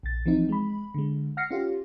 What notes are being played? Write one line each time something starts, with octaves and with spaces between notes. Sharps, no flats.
A#1 A6
E3 F3 C4 D#4
G#3 B5
D3 G#3
F#5 F6 A#6 C7 C#7
C#4 F4 G4